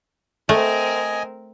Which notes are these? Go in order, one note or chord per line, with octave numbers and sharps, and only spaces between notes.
A3 C4 A#4 D#5 G#5